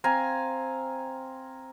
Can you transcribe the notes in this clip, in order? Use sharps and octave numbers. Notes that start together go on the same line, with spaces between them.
C4 F5 G#5 A#5